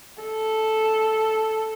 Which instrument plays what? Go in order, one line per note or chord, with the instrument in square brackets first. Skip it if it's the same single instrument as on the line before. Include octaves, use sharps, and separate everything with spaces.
[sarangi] A4